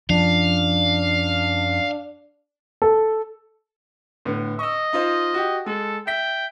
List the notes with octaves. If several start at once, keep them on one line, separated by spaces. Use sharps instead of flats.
F#2 F3 D4 F5
A4
A2 D3 B3
D#5 C#6 E6
D#4 F4 C5
F#4 G4
G#3 A4
E5 G5 B6